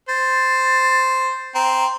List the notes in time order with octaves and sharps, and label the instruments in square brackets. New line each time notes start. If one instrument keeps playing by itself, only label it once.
[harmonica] C5 [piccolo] A6
[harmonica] C4 [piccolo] A#5